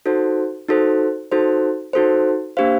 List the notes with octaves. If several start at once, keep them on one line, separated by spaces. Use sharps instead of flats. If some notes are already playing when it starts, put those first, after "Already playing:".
D#4 F#4 A4 C5
D#4 F#4 A4 C5
D#4 F#4 A4 C5
D#4 F#4 A4 C5
A#3 D4 G4 C5 F5